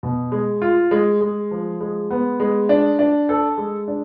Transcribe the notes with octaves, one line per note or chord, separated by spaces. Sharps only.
B2
G#3
F4
G#3
G#3
F3
G#3
B3
G#3
D4
D4
A4
G#3
D4